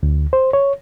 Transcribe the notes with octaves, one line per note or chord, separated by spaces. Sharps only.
D2
C5
C#5